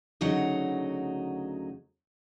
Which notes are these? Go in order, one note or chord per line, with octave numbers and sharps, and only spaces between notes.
D2 C#3 F#3 D#4 F#5